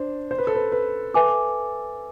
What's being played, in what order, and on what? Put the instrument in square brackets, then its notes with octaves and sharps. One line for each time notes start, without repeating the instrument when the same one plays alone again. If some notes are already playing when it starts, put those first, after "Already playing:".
Already playing: [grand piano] D4 C5
C5
B4
A4
B4
B4
[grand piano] A4 [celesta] B4 E5 G#5 D6